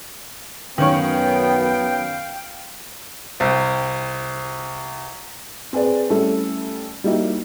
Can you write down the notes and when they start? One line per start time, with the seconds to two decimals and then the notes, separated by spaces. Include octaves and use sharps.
0.78 F#2 D#3 B3 C#4 F5 G5 C#6
3.40 C2 C4
5.73 C4 G#4 B4 D5
6.10 G3 A3 C#4 E4 A4
7.04 G3 A#3 D#4 E4 F#4